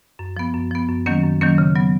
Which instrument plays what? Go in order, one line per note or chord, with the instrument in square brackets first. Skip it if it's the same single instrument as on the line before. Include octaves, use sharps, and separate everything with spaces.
[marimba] F#2
F3 B3
F#2
F3 B3
F#2
D#3 F#3 A#3 C#4
F#2
D#3 F#3 A#3 C#4
C#3
F#3 B3